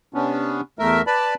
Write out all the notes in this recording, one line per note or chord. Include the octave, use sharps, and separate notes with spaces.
C3 B3 C#4 D4
E2 A3 A#4 E5
B4 D5 A5 B5